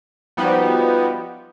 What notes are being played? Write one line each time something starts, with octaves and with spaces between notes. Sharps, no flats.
F3 G3 B3 D#4 F#4 G4